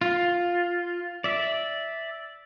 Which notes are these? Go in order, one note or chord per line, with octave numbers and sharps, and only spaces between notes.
F4
D5 E5